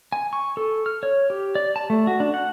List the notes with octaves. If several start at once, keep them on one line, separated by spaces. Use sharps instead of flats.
G#5
C#6
A4
F6
C#5
G4
D5
A5
A3
F#4
D4
F#5